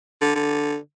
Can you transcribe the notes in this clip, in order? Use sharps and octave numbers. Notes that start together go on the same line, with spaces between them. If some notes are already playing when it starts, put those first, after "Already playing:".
D3
D3